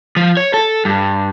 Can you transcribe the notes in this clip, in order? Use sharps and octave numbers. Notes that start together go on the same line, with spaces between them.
F3
C#5
A4
G2